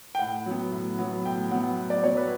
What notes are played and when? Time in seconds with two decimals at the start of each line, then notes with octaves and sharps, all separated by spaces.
0.15 G5
0.19 A2 F#5
0.46 F#3 B3
0.72 A2
0.99 F#3 B3
1.25 A2 G5
1.51 F#3 B3 F#5
1.78 A2
1.90 D5
2.04 F#3 B3 C#5
2.17 B4